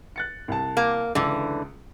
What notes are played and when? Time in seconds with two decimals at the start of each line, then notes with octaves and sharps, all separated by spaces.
0.16 F#6 A6 C#7
0.48 C2 A5
0.77 A#3
1.15 C#2 D3 E3